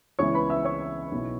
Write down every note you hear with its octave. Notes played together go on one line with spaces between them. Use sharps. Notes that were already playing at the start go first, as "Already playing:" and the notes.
C#2 C#3 E3 B3 E4 C#5 C#6
B4 B5
E5 E6
C#5 C#6
B1 B2 B3 E4